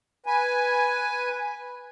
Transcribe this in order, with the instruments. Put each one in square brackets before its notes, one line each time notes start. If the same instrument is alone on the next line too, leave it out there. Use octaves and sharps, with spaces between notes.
[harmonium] B4 G#5